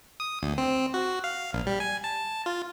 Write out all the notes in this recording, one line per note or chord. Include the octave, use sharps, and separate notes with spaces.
D#6
D2
C4
F#4
F5
A#1
G3
G#5
A5
F4